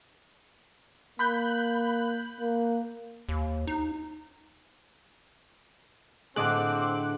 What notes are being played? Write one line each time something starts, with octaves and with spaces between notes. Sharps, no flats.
A#3 B5 F#6 G6
A#3
D#2
D#4
A2 D3 C4 G#4 D#5 A5 D6 F#6